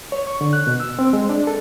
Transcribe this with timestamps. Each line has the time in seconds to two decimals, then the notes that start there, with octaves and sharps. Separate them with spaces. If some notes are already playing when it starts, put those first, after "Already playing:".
0.12 C#5
0.27 C#6
0.41 D3
0.53 F#6
0.67 B2
0.80 E6
0.99 C4
1.13 G#3
1.29 D4
1.47 A4